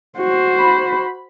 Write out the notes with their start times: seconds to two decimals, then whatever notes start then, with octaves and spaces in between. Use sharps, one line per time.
0.18 F#4 C5
0.58 B5